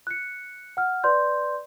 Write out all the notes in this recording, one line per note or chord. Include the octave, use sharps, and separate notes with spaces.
F#6 C#7
F#5 F6
B4 D5 C6 G6